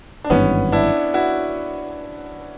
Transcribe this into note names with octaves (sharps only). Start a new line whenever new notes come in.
D4
G#1 G2 E3 B3 C#4
D4 E4
E4 F#4